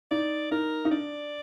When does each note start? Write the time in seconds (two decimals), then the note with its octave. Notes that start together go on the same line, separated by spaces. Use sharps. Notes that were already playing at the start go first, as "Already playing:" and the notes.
0.11 D#4 D5
0.51 D#4 A#4
0.85 D#4
0.91 D4 D5